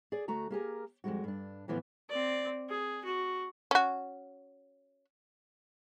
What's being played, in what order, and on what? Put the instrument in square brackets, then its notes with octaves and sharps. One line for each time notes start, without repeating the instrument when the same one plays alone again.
[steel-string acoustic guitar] G#4 D5
D2 A3 F#4 A#5
A#3 G4 G#4 A#4
F2 A#2 G3 G#3 F#4
G2 D4
D2 A2 E3 F3 B3
[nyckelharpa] C4 D5
G#4
F#4
[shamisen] C#4 F#4